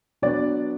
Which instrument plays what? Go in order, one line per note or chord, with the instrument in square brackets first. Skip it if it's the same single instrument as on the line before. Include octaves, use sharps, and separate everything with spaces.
[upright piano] F#3 B3 D4 D5